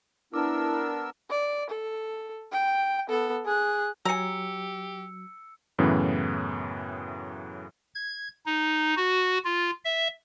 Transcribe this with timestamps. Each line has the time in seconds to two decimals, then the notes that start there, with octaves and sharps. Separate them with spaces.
0.34 B3 D4 E4 A#4 A5 D6 E6
1.30 D5
1.70 A4
2.52 G5
3.09 B3 A4
3.45 G#4 F#6
4.05 F#3 G4 G#5 A#5 E6 C#7
5.79 F#2 A2 C#3 E3 B3
7.95 G#6
8.46 D#4
8.97 F#4
9.44 F4
9.85 E5